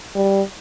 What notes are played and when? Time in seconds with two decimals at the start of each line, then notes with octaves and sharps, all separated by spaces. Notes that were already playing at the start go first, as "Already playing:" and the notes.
0.16 G3